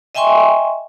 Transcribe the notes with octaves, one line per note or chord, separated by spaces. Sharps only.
D#5 E5 G5 G#5 C6 C#6